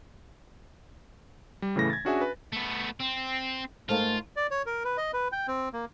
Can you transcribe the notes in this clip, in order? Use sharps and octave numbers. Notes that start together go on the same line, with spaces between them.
G3
A2 C#3 E3 A3 A#6
G#6 A6
C#4 D4 F#4 G#4 E5 G#5
B4
A3 B3
C4
G#2 A3 A#3 F4
D5
C#5
A#4
B4
D#5
B4
G5
C4
A#3